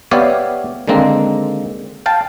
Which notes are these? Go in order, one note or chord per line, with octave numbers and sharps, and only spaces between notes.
B3 G4 C#5 D5 E5 F5
D3 D#3 G#3 A#3 C4 A#5
F5 G5 A5